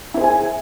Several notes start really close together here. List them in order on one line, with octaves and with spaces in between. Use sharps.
E4 C5 G#4 G#5